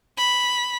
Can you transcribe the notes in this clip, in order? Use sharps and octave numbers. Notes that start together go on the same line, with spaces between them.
B5